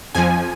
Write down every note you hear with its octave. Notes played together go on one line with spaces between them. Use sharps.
F2 F3 G#5